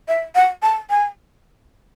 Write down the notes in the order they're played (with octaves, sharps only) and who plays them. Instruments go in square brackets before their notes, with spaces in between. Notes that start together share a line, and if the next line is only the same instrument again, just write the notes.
[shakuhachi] E5
F#5
A5
G#5